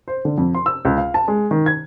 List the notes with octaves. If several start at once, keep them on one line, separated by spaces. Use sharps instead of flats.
C5
D3
F2
C6
E6
C#2
F5
A5
G#3
D#3
G#6